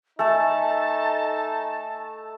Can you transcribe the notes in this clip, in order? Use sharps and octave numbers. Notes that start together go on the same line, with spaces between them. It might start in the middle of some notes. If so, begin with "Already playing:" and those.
A3 D#4 A4 E5 G#5 A5